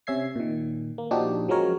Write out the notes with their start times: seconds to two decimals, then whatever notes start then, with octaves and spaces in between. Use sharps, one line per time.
0.07 C3 C#4 E5 G#6 C7
0.36 A#2 D#3
0.98 A#3
1.11 A#2 F3 D4 D#4 F#4 G4
1.48 F3 F#3 G#3 C#4 A#4 C#5